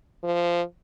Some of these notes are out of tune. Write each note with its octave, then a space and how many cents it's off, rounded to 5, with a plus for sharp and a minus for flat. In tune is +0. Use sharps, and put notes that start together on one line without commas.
F3 -15